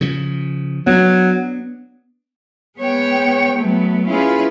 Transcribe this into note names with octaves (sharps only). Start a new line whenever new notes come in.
C#3 F3
F#3 B3 D4
G#3 B3 C#5 G5
F#3 A3 B3
C#4 E4 F4 G#4 B4